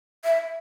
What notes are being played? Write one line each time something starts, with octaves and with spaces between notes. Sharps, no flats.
E5